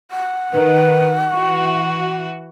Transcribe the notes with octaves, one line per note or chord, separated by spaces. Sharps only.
F#5
D#3 B4
E3 F#4 C#6